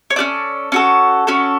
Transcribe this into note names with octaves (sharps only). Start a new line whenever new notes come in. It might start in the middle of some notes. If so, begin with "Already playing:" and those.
C#5
C#4 F#4 A4 D5
C#4 F#4 A4
C#4 F#4 A4